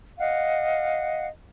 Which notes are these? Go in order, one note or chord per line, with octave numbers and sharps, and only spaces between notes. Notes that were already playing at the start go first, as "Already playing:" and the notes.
D#5 F5 F#5